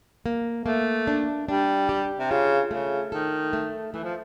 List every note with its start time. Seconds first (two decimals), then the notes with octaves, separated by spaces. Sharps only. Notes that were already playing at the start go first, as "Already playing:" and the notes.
0.26 A#3
0.66 A3 A#3
1.07 D4
1.48 G3 D4
1.89 G4
2.19 C3
2.30 C#3 F4
2.71 C#3 A3
3.12 D#3 A4
3.53 A3
3.94 E3 A3
4.04 F3